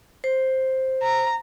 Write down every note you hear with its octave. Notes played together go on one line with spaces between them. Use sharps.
C5
A#5